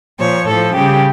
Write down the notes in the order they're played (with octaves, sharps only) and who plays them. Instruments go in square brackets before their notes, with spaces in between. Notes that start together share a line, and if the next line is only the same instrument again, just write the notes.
[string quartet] A#2 F3 C#5
A2 F3 A4
C#3 G3 G4